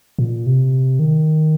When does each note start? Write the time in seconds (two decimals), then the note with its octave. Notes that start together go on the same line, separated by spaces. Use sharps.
0.19 A#2
0.46 C3
0.99 D#3